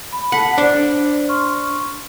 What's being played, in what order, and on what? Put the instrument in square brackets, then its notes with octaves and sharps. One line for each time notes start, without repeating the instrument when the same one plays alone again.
[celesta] B5
[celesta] A4 A5 B6 [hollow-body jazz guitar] F#5
[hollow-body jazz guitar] D4 D5 [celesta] C5
[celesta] C6 C#6 F6